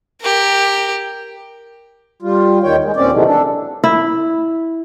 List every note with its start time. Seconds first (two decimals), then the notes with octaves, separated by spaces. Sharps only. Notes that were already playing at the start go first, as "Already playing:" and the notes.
0.21 G4 A#4
2.22 G3 F4
2.63 D#2 D#3 C#5 G5
2.84 G#3
2.96 D#2 A#2 C4 C#4 D5
3.12 C3 D#3 E3 F#3 G#3 A3
3.26 D4 A4
3.84 E4